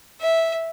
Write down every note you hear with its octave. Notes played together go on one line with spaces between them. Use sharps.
E5